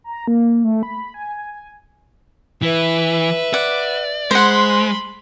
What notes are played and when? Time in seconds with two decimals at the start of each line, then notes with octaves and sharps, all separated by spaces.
0.04 A#5
0.28 A#3
0.64 A3
0.83 B5
1.14 G#5
2.62 E3 B4 E5
3.54 D5 F#5
4.31 G#3 C5 F#5 B5 C6